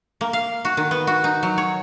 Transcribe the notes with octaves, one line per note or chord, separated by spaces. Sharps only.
A#3
F5
F#4
D#3
B3
F#4
D#4
F#3
C#5